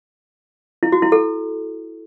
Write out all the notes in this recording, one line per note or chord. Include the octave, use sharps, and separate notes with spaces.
E4
F#4
E4
A4